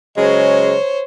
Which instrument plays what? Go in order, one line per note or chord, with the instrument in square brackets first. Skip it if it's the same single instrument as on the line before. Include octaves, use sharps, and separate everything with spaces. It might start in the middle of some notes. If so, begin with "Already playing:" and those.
[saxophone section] C#3 F#3 G#3 [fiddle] C5 C#5